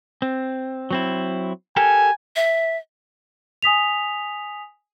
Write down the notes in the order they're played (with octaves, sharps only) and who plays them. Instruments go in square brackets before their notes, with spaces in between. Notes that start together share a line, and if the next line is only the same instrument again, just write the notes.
[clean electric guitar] C4
F#3 C4 E4
[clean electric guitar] G4 A4 A#4 [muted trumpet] G#5
[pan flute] E5
[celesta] G#5 D#6 B6 F7